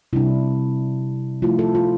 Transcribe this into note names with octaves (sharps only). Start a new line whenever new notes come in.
C3 G3 D4 E4
F3 A3 E4 F4
A4
F4